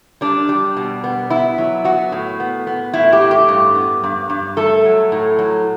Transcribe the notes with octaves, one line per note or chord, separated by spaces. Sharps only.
G3 D4
G3
B2
B3
B3 E4
F#3
B3 F#4
A2
B3
B3
A2 E4
G4
A2
G4
G2
B3
G2
G2
A3 A4
F#3
A2
F#3